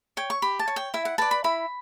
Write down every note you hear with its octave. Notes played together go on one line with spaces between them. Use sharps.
C#5 G5
C#6
G4 B5
A5
C#5
G5
E4 E5
F#5
B4 D5 A5
B5
E4 B5